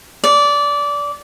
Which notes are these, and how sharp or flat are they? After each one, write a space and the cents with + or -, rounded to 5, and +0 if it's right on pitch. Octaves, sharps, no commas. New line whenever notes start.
D5 -20